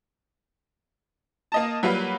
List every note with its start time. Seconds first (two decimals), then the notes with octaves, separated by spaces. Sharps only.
1.52 A#3 D#5 A5
1.83 F#3 G3 A#3 F4 B4